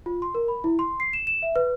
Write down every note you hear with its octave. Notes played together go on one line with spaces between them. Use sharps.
F4
C6
A#4
B5
E4
C6
C7
E7
E7
E5
B4